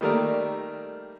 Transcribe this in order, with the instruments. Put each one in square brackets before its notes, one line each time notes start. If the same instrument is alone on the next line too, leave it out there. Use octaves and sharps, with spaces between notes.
[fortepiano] D#3 G3 A3 A#3 A#4 D5